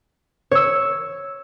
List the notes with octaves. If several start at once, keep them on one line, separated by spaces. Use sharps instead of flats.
C#5 E6